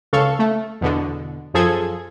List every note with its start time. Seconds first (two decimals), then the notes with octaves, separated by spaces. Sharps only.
0.13 C#2 C#3 A4 F5 C#6
0.39 A3
0.81 E2 B2 D3
1.54 F#2 F3 G#4 A4 G#6